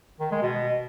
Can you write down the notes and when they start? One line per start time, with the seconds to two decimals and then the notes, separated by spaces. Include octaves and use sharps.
0.20 D#3
0.31 G#3
0.42 B2